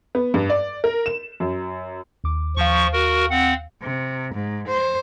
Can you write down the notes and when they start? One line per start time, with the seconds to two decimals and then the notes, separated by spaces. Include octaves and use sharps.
0.15 B3
0.34 G2
0.50 D5
0.84 A#4
1.06 E7
1.40 F#2
2.24 D#2 D6
2.57 D#2 F3 F5 C#6
2.93 F#4 A#4
3.30 C4 F#5
3.82 C3
4.34 G#2
4.68 C5